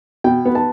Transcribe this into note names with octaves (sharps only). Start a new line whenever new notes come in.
B2 G5
B3
A5